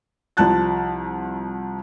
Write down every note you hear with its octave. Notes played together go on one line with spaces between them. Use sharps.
C2 F3 A5 F#6 A6